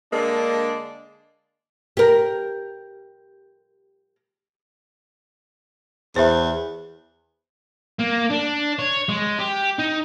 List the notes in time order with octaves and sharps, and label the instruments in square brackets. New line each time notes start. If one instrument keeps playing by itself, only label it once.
[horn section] D3 G#3 A#3 D4
[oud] G4 A#4
[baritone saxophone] E2 [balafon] C5 E5
[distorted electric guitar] A#3
D4
C#5
G#3
G4
D#4